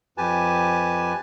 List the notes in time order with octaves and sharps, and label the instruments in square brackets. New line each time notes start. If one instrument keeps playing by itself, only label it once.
[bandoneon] F2 G4 B4 G#5 A5